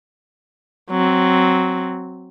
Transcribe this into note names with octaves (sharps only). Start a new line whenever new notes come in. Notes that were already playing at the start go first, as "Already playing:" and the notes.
F#3 C4